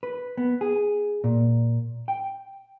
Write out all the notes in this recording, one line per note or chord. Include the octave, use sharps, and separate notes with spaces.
B4
B3
G#4
A#2
G5